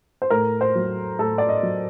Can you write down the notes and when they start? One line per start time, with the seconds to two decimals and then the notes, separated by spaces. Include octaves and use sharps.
0.22 C5
0.30 A2 A#4
0.61 C5
0.76 F#3
1.19 A2 A4
1.38 D5
1.49 D#5
1.63 F#3